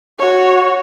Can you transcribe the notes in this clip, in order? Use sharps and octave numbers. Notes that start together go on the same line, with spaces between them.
F#4 C#5